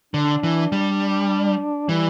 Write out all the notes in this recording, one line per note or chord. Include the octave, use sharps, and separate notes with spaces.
D3 D4
E3
G3
E3 G3